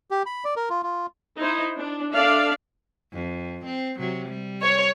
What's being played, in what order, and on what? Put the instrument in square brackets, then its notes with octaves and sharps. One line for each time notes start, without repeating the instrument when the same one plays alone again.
[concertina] G4
B5
D5
A#4
F4
F4
[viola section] D#4 E4 C5
D4
D4 A4 D5 E5 F5
[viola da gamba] F2
C4
C3 F#3
G3
[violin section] C#5